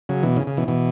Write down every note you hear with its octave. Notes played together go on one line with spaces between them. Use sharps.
C#3 F#3
B2 E3
C#3
C#3
B2 E3
B2 E3